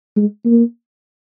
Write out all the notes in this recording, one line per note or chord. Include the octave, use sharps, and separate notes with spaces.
G#3
A#3